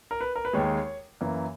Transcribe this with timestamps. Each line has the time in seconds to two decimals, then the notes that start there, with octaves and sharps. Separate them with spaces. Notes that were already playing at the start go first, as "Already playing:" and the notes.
0.11 A#4
0.21 B4
0.36 A#4
0.45 B4
0.53 D#2 D#3 G#3 C#5
1.21 F#2 E3 A#3